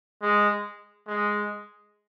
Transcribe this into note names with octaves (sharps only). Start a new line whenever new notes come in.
G#3
G#3